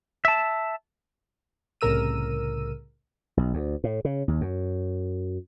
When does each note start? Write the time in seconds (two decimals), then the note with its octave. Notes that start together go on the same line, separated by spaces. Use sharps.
0.25 E5 A5
1.81 C2 A2 C#3 A#4 E6 D#7
3.37 B1
3.54 D2
3.84 A2
4.05 C#3
4.28 D#2
4.41 F#2